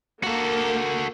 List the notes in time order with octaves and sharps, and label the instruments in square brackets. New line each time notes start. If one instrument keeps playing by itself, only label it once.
[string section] A#3 [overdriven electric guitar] F#4 A4